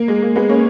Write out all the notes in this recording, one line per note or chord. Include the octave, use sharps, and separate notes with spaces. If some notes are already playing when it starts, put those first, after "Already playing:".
Already playing: A#3
G#3
A#3
G#3 B3
A#3 C#4